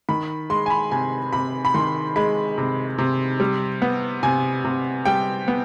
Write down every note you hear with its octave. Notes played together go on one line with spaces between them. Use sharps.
D#3 B5
G#3 C6
G#5
B5
C3 G#5
C3 B5
B5
D#3 C6
G#3 B5
C3
C3
G3
B3
C3 G#5
C3
G3 G5
B3